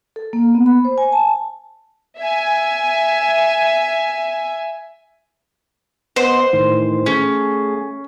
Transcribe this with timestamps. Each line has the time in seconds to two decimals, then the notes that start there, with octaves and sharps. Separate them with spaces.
0.16 A4
0.33 A#3
0.55 B3
0.66 B5
0.85 C5
0.98 G#5
1.13 A5
2.19 E5 G#5
6.16 B3 C5 D#5 F#5
6.53 A2 D#3 E3
7.06 A3 C#4 G#4